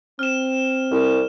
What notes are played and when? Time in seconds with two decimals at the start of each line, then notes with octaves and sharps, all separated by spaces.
0.19 C4 F6 E7
0.91 C2